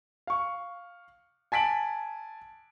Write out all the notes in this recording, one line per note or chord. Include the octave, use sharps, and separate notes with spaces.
F5 C#6
G#5 A5 B6 D7 F#7